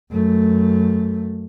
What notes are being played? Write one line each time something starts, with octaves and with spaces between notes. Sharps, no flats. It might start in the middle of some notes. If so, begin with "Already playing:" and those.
F#2 A3